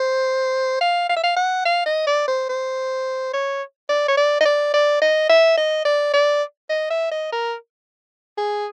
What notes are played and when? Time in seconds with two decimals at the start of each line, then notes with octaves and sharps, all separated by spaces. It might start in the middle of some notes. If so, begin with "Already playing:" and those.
Already playing: C5
0.81 F5
1.09 F5
1.16 E5
1.24 F5
1.37 F#5
1.65 F5
1.86 D#5
2.07 D5
2.28 C5
2.49 C5
3.33 C#5
3.89 D5
4.08 C#5
4.17 D5
4.41 D#5
4.45 D5
4.74 D5
5.02 D#5
5.29 E5
5.58 D#5
5.85 D5
6.14 D5
6.70 D#5
6.91 E5
7.12 D#5
7.32 A#4
8.38 G#4